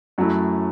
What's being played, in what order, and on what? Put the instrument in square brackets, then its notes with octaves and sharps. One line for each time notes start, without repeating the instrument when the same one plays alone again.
[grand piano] F#2 F#3 A3 E4